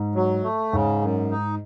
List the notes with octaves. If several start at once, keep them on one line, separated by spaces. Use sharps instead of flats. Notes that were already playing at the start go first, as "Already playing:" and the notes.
Already playing: G#2
F#3
A3
G#2 C#3
F#2
D#4